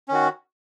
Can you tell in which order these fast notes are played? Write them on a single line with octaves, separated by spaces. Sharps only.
C#4 D#3 F#4